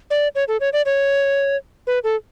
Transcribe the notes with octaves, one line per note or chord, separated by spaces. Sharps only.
D5
C#5
A4
C#5
D5
C#5
B4
A4